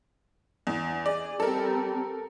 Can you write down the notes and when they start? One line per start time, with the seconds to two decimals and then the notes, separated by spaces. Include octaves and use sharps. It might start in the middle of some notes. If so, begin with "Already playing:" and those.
0.67 E2
1.06 G#4 D5
1.40 G3 C4 A4 A#4